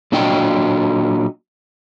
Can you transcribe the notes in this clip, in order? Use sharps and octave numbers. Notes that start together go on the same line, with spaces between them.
A#2 F#3 D4 F#4 D#5 G5